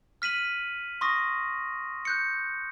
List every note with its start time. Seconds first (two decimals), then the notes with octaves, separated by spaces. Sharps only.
0.22 F6 B6 D#7 F#7
1.01 C6 C#6 D#6 A#6
2.05 F#6 G6 C#7